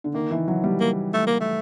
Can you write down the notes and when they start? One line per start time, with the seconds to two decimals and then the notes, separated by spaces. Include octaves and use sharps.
0.04 D3
0.14 D#3 A#3
0.31 E3
0.48 F#3
0.64 G3
0.80 A#3
1.14 A3
1.27 A#3
1.41 A3